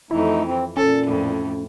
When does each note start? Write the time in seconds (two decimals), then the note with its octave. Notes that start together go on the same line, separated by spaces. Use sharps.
0.11 F2 E3 A3 D#4 E4
0.45 C4
0.77 A#2 C#4 A4
1.07 F2 A2